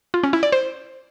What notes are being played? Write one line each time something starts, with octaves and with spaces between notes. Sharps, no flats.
F4
C#4
E4
D5
C5